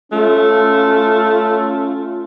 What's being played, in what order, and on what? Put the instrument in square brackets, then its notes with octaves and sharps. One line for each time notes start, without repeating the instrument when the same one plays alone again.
[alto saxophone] A3 [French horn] C#4 [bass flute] F4